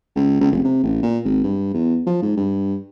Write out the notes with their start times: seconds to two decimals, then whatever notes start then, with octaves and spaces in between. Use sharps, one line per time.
0.16 C#2
0.41 C#2
0.52 F1
0.64 C3
0.83 A1
1.03 A#2
1.24 G#1
1.43 G2
1.74 E2
2.07 F3
2.22 G#2
2.37 G2